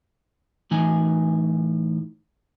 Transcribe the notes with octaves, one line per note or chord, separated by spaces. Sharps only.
A2 E3 D#4 G#5